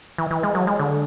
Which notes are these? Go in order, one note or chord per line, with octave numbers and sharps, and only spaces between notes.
E3
E3
G#3
F#3
G#3
D3